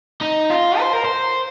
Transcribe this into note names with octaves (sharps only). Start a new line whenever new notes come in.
D#4
F4
C5
A#4
C5